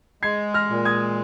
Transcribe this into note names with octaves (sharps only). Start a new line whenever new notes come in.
G#3 G#6 C7
F6 A#6
A#2
D#6 G#6